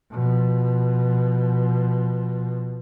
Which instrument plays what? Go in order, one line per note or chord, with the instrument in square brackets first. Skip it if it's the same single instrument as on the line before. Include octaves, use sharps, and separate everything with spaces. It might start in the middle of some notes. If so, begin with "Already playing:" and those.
[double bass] B2 F3